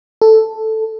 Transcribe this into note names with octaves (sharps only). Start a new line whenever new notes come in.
A4